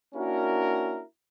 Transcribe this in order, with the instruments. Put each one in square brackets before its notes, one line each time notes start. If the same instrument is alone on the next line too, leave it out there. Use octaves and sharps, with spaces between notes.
[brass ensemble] A#3 C#4 D4 E4 F#4 A#4